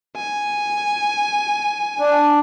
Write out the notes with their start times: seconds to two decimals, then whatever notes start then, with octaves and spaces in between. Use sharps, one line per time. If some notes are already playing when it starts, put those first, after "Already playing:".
0.17 G#5
1.99 D4